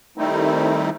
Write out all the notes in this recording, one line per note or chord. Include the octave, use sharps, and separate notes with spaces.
D#3 G3 A3 C4 D#4 E4